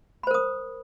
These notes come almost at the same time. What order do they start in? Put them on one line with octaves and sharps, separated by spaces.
B5 C5 A#4 D#6